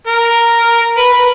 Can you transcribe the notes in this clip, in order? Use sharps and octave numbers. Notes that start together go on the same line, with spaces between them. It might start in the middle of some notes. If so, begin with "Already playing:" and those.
A#4
B4
B4